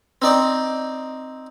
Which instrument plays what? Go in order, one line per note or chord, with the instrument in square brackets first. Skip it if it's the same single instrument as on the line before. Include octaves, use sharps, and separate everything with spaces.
[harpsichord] C4 D#4 D5